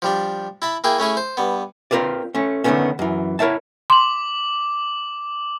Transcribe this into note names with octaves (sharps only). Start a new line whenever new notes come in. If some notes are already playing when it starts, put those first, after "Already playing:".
F3 G3 D4
E4 A5 B5
A#3 E4 G#4 G5
A3 C#4 E4 G#4
C5
G2 B3
C4 F4 A#4 B4 D5
A3 C#4
D3 D#3 F#3 A3 B3 C#4
F#2 E3
E4 A#4 C#5 E5 A5
C6 D6 F#7